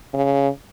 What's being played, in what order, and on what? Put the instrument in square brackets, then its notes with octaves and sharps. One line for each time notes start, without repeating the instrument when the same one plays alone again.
[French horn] C#3